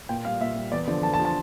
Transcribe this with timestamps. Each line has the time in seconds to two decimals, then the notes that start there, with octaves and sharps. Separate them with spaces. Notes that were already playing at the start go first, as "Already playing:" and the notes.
0.09 A#2 G5
0.25 G3 F5
0.40 A#2 E5
0.56 G3
0.72 E2 D5
0.88 D3 F3 D5
1.03 E2 A5
1.14 A5
1.19 D3 F3
1.25 A5